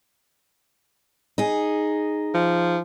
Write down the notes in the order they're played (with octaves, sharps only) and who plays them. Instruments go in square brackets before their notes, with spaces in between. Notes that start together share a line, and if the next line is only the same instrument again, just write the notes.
[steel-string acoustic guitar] D#4 G#4
[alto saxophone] F3